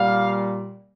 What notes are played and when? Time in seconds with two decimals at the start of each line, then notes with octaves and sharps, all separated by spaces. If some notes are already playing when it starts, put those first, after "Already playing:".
Already playing: A#2 G3 F5